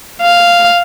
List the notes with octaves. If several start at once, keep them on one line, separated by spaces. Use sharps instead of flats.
F5